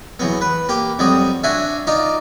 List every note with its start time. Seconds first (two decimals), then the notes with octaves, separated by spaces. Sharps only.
0.20 E2 F#3 B3
0.41 B4
0.69 A#3 G4
0.99 F2 F#3 G3 D#6
1.44 D4 F#4 E5 G#5
1.87 D#4 F4 D5